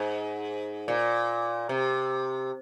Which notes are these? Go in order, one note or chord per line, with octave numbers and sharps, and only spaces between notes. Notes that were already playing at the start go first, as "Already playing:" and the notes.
Already playing: G#2
A#2
C3